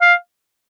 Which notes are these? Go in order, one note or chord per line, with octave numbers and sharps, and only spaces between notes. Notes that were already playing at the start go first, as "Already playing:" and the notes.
F5